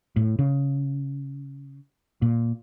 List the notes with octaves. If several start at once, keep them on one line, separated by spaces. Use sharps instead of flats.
A2
C#3
A#2